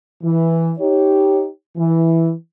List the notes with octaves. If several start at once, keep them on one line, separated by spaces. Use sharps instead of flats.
E3
D#4 G4 C#5
E3